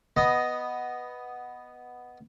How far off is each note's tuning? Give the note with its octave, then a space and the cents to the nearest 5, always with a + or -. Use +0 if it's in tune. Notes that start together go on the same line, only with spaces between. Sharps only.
B3 +0 D#5 +0